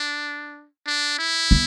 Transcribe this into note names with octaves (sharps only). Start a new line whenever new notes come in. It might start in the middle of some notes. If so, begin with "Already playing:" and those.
Already playing: D4
D4
E4
B3